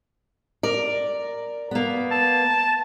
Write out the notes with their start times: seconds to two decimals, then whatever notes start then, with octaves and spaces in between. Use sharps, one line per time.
0.63 A#4 D5
1.71 A#3 B3
2.11 A5